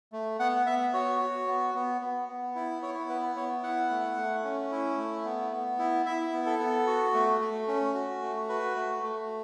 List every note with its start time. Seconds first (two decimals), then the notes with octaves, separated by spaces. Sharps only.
0.12 A3
0.39 B3 F#5
0.66 B3 E5
0.93 F#4 C#5
1.21 F#4
1.48 B3
1.75 B3
2.01 B3
2.28 B3
2.55 E4
2.82 E4 C#5
3.09 B3 B4
3.36 B3 C#5
3.63 E4 F#5
3.90 A3
4.17 A3
4.44 C#4
4.71 E4
4.98 A3
5.25 B3
5.52 B3
5.79 E4
6.06 E4 E5
6.33 B3
6.46 A4
6.59 B3
6.87 F#4
7.14 A3
7.41 A3
7.68 C#4
7.95 F#4
8.22 A3
8.49 F#4 B4
8.76 A3
9.03 A3